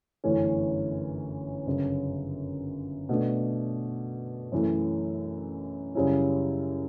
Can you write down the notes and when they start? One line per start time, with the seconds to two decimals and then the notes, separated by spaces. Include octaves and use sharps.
0.24 G1 F#2 E3 A3 C#4
1.67 G1 F#2 C#3
3.09 B2 A3 D4
4.52 F#2 E3 A3
5.95 F#2 C#3 G3 C#4 E4